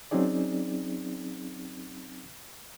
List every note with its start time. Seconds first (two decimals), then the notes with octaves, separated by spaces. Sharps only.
0.11 F#3 C4 C#4 D#4 G#4 D5